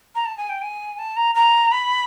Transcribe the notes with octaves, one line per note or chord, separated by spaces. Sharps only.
A#5
A5
G#5
G5
G#5
A5
A#5
A#5
B5